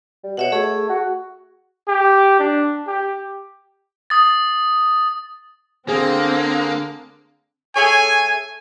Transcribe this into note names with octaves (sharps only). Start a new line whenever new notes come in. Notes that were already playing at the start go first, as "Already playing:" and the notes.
G3
B2 C#5 E5 F#5
A3 G#4
F#4
G4
D4
G4
D#6 A6
D3 A#3 C4 G#4
A3 G#4 C#5 G#5